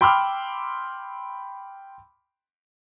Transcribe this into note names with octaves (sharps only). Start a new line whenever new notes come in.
G5 B5 C6 D6 E6 F6